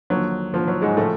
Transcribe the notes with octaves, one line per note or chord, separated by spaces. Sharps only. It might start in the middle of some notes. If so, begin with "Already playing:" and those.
D#2 D3 F3 F#3
D#2 D3 F3
F#3
G#2 G#3
A2 C#3 F3 A3